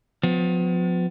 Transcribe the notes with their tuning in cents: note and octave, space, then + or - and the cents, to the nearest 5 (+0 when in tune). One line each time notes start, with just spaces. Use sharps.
F3 +35 B3 +40